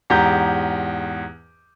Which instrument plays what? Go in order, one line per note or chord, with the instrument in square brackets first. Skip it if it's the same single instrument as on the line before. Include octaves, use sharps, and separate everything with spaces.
[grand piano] E2 G#2 G4 A#5 G6